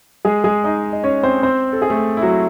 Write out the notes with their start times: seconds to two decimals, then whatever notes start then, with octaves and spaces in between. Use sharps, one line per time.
0.25 G#3 G#4
0.44 G#3 G#4
0.64 D#4 D#5
0.93 D#5
1.04 C#4 C#5
1.23 C4 C5
1.43 C4 C5
1.73 A4
1.82 G#4
1.90 A3 A4
2.17 E4
2.22 F#3 F#4